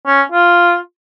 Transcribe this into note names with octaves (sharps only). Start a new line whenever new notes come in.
C#4
F4